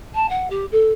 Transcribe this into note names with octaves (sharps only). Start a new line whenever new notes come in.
A5
F#5
G4
A4